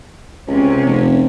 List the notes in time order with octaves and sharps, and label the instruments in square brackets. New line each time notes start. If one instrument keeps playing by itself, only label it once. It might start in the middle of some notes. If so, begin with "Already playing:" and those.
[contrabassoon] C#2 [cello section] C3 C#4
[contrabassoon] F1